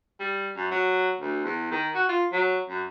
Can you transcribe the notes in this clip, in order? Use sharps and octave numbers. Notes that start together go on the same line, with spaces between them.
G3
F#2
F#3
D2
E2
D#3
F#4
F4
F#3
F#2